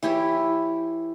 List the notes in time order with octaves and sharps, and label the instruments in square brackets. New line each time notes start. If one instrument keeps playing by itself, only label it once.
[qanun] E3 E4 G4 C#5